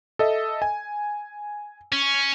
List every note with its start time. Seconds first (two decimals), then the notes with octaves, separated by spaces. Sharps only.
0.19 A4 D#5 E5
0.62 G#5
1.92 C#4